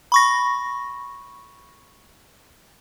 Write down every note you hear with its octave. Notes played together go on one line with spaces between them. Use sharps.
B5 C#6 A#6